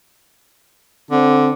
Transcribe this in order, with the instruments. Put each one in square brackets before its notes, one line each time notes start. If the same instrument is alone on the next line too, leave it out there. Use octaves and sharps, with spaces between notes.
[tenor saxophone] D3 [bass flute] C4